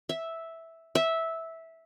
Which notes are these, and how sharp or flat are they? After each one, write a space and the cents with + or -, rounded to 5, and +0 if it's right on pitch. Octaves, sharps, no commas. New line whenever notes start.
E5 -5
E5 -10